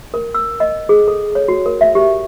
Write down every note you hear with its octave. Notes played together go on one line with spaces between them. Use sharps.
A#4
E6
D#5
G#4
A4
C#5
F#4
A#4
E5
G4